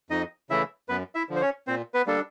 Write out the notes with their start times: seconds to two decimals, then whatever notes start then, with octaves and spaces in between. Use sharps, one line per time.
0.10 F2 D#4 D#5
0.50 C#3 E3 A3 E4 E5
0.89 F#2 B3 B4
1.15 E4 E5
1.29 D3 F3
1.36 C5
1.42 C#4 C#5
1.67 A#2 C4 C5
1.94 B3 B4
2.07 G3 A#3 D4 A4